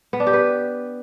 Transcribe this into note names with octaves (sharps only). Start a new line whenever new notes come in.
B3
D4
G4
B4